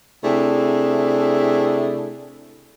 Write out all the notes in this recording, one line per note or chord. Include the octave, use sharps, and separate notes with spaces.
C3 A3 D4 E4 G#4